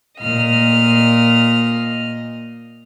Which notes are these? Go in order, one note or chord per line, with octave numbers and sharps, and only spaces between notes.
A#2 D#5 F6